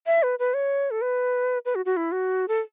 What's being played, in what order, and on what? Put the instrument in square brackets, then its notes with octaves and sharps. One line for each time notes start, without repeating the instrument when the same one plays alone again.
[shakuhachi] E5
B4
B4
C#5
A4
B4
B4
F#4
F#4
E4
F#4
A4